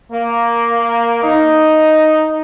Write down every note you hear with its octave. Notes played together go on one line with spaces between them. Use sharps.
A#3
D#4